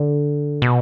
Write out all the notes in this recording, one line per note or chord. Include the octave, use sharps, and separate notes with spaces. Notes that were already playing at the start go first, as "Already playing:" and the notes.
Already playing: D3
B2